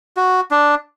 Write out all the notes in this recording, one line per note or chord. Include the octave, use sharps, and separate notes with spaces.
F#4
D4